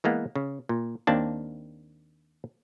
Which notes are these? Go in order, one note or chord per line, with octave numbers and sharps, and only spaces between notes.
E3 G#3 A#3 B3
C#3
A#2
D#2 A#3 C4 D4 A5